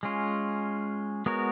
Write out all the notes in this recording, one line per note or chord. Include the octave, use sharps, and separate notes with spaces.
G#3 C#4 F4
G#3 B3 F#4 A#4 C#5